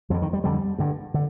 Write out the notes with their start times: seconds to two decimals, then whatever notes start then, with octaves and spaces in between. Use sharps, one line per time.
0.10 F2 D3 F3
0.22 D#3
0.33 G3
0.44 F2 D3 G3
0.78 G2 D3
1.14 D3